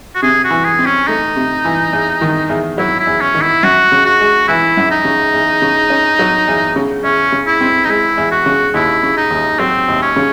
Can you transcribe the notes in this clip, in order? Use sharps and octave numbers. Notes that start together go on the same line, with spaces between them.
F#4
C3 G#4
F#4
E3
G#4
C4
C#4
A3 D#4
C3
E3
E2
D#3
E2
F#3 E4
E4
E2
C#4
D#3
E4
F#2 F#4
C#3
F#4
G#3
E3 E4
F#2
D#4
C#3
E2
C#3
C#4
F#3
E2
C#3
E2 C#4
C#3
E4
C4
D#4
G#3 E4
E2
F#4
C#3
D#2 E4
C#3
D#4
D#2
F#3 C4
D#2
C#4
C#3